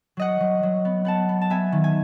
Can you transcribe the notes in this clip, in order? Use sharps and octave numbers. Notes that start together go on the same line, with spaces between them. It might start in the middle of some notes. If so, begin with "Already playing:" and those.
F#3 D#5 F#5
F#3
F#3
B3
B3 F#5 A5
B3
A5
B3 E5 G#5
D#3
G#5